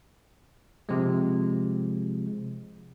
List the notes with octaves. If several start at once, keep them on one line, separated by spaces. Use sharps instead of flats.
C3 F3 G#3